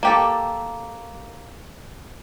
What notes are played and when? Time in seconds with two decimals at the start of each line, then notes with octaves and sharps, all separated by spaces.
0.03 A#3 G4 A4